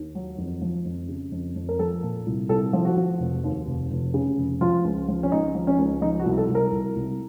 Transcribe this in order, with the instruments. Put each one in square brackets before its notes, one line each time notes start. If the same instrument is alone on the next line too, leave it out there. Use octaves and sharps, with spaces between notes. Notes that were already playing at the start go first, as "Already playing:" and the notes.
Already playing: [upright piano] D#2
F#3
F2
F3
F2
C#3
F2
F2
A#4
F3 A4
A#2
C2
C2 A4
F3
F#4
F3
F1
D#2
F1
F1
C#3
F1
F3 F4
C#2
F3
C#4
C#2 D#4
F3
C#4
C#2
F3 D#4
F#4
C2
A4
C2
A#4
C2
C2